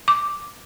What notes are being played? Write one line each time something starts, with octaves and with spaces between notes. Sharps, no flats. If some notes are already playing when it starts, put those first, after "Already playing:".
D6